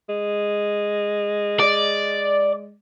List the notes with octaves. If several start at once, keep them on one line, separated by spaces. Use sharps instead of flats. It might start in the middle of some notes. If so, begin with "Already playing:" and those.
G#3
D5